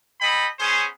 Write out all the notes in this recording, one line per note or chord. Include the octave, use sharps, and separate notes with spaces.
A4 D#5 G5 B5
B3 C#4 G#4 C5